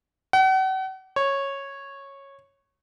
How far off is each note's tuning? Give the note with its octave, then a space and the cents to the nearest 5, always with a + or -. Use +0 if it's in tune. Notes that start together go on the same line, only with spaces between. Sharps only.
F#5 +40
C#5 -10